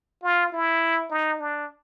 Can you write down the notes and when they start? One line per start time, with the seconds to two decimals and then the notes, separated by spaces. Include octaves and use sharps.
0.23 F4
0.53 E4
1.10 D#4
1.40 D4